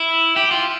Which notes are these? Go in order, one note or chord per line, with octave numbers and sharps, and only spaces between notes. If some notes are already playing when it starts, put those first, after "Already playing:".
Already playing: E4
G4
F4